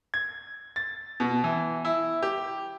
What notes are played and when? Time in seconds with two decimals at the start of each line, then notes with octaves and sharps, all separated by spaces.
0.14 G#6
0.76 A6
1.20 B2
1.44 E3
1.85 E4
2.23 G4